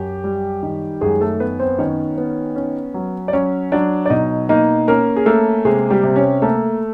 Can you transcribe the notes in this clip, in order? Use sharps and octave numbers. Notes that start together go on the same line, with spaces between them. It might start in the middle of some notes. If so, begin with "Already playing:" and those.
Already playing: F#2 G4
G3
D#3
F#2 G#3 G#4
A3 A4
B3 B4
C4 C5
D#3 C#4 C#5
B3
C#4
F#3
D5
F#3 C#4 C#5
F#3 D4 D5
D5
B2 D#4 D#5
A#3 D#4 D#5
A#3 C#4 A#4
G#4
A3 A#3 A4
C3 G#3 G#4
G3 G4
C3
C#4 C#5
A3 A#3 A4